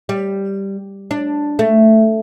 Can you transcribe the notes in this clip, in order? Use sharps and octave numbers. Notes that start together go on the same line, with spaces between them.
G3
D4
A3